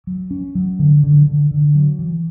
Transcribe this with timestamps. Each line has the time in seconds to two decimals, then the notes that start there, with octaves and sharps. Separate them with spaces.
0.07 F#3
0.31 C#4
0.55 F#3
0.79 D3
1.03 D3
1.27 D3
1.51 D3
1.75 F#3
1.99 E3